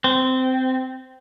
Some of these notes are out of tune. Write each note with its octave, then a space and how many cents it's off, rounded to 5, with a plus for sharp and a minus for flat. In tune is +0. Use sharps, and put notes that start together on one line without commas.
C4 -15